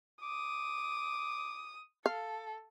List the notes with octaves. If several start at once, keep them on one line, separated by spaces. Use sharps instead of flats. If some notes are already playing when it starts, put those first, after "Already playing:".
D6 D#6
A4 F5